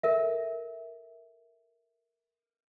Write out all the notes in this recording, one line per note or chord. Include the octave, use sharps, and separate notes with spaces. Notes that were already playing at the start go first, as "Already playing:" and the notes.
A4 A#4 E5